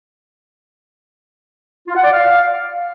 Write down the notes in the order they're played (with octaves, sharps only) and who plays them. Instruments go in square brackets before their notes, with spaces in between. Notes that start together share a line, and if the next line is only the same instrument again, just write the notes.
[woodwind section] F4
F#5
D5
F5